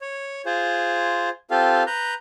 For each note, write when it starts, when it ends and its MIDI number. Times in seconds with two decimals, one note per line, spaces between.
0.01 0.42 73
0.46 1.29 65
0.46 1.29 68
0.46 1.29 72
1.51 1.83 60
1.51 1.83 65
1.51 1.83 67
1.51 1.83 69
1.51 1.83 77
1.87 2.14 71
1.87 2.14 82
1.87 2.14 91